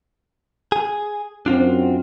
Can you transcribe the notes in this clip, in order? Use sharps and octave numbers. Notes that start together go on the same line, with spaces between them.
G#4
F#2 C4 D4 F4 F#4